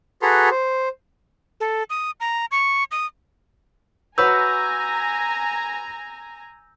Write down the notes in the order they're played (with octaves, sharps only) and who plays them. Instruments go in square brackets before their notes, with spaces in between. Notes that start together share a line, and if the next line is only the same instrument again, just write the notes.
[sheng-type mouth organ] F#4 G#4 A4 B4 A#5 C6
C5
[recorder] A4
D#6
A#5
C#6
D#6
[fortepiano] F#4 B4 C#5 [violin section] G#5 A#5 [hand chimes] E6 G6